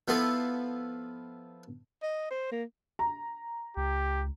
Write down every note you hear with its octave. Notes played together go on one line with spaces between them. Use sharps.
F3 B3 E4 F4 A4
D#5
C5
A#3
A#5
C#2 G4